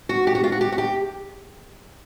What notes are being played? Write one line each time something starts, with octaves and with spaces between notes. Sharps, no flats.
F#4
G4
F#4
F4
F#4
G4
F#4
G4